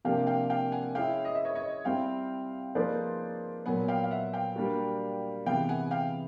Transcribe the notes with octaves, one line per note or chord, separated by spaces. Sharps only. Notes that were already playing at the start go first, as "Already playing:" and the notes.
C3 F3 A#3 D4 G4 F5 G5
F5 G5
F5 G5
F#5 G#5
G#3 C#4 E4 F5 G5
D#5
E5
C#5 D#5
C#5 D#5
G3 C4 E4 F5 G5
F3 A#3 D#4 G#4 B4 C5 D5
A#2 F#3 B3 F#5 G#5
F5 G5
F5
E5 F#5
F5 G5
G3 A#3 D4 F#4
C3 E3 G#3 B3 F5 G5
F#5 G#5
F5 G5